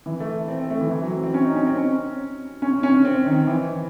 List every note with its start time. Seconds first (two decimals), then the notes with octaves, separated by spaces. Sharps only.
0.06 E3
0.20 A3
0.48 C4
0.59 C4
0.70 A3
0.81 E3
0.91 E3
1.02 F#3
1.13 C4
1.24 C4
1.34 C#4
1.45 D#4
1.56 C#4
1.66 C4
1.77 C#4
2.62 C#4
2.73 C#4
2.83 C#4
2.94 C#4
3.05 C4
3.26 D#3
3.47 E3